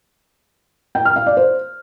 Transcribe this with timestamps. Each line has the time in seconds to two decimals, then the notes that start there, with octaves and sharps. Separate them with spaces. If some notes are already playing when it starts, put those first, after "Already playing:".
0.95 G5
1.05 F6
1.16 F5
1.26 D5
1.37 C5